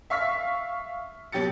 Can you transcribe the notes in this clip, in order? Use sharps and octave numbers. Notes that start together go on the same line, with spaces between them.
E5 F5 C#6 F6 B6
B2 F#3 G4 A6 C#7